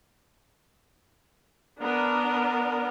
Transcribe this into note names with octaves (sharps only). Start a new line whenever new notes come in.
B3 D4 A#4